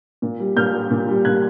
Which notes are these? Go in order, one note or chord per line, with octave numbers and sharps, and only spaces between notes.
A#2
G3
A#2 F6 G6
G3
A#2
G3
A#2 F#6 G#6